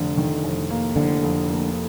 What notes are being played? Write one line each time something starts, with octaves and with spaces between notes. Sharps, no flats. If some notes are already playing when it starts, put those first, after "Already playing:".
Already playing: F1 D3
D#3
F1
A#3
F1 D3
F2
A#3